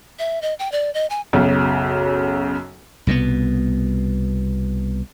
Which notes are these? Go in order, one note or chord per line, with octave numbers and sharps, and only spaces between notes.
E5
D#5
G5
D5
D#5
G#5
B1 F#2 C#3
C2 B2 F#3 B3